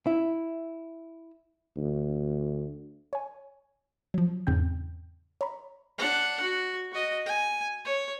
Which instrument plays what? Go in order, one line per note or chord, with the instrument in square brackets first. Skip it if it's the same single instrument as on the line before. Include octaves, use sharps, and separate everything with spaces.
[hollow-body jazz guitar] E4
[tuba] D2
[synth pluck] C#5 G#5
F3 F#3
E2 G#2 C#3 C4 G5 G6
C#5 A#5 B5
[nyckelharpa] D4 F#5
F#4
F#4 D#5
G#5
C#5